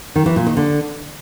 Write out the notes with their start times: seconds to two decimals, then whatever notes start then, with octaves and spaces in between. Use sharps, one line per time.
0.16 D#3
0.26 E3
0.36 A#2
0.46 D#3
0.57 D3